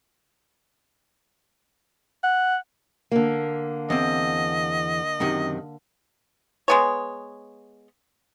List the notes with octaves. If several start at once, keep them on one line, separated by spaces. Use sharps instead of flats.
F#5
D3 A#3
E2 C4 D#5
F#2 C3 D#3
G#3 B3 C#5